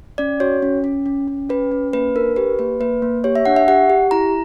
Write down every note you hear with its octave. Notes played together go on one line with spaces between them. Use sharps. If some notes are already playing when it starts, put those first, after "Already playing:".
C#4 D5
F#4 C#5
C#4
C#4
C#4
C#4
C#4 B4
C#4
A#3 B4
D4 A#4
G4 B4
A#3 B4
A#3 B4
A#3
G4 C#5
E5
D4 F#5
E5
G4 F#5
G4
E4 A#5